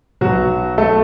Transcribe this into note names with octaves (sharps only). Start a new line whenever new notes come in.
B1 B2 F#3 F#4
A3 A4